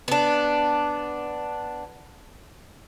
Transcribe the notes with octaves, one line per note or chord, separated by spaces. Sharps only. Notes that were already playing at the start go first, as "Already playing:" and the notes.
B3 D4